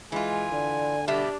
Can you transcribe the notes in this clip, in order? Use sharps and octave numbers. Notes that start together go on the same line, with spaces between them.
E3 G#3 F4 G#5
D3 D5
B2 G3 D4 G4 E5